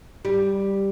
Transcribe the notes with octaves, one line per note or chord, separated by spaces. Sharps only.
G3